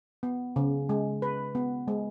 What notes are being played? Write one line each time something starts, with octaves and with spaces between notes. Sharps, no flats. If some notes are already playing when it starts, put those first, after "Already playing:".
B3
C#3
G#3
B4
B3
G#3